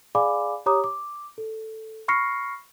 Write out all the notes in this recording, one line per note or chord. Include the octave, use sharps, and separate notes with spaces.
G#4 D5 F5 G#5 B5 D6
G4 C#5 A#5 D6 D#6
D6
A4
B5 C#6 F6 A#6 C7 C#7